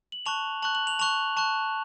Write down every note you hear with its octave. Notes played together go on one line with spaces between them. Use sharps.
F#7
A5 C#6 F#6 F7
A5 C#6 F#6 F#7
F#7
F7
A5 C#6 F#6 F7
A5 C#6 F#6